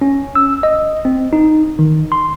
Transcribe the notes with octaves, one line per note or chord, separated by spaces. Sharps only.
C#4
E6
D#5
C4
D#4
D#3
C6